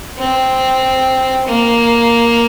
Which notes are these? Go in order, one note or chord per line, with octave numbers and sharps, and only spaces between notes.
C4
A#3